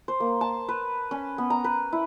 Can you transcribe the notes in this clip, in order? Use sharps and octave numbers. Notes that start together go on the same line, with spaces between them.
C5
A#3
A5
B4
C#4
B3
A#5
B4
E4